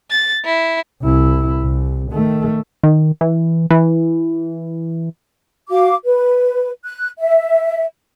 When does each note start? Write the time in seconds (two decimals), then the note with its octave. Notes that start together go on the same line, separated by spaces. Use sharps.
0.11 A6
0.45 E4
1.02 C2 E4
1.62 C2
2.12 D#3 A3
2.83 D#3
3.21 E3
3.71 E3
5.70 F#4 F5 D6
6.06 B4
6.84 F#6
7.19 E5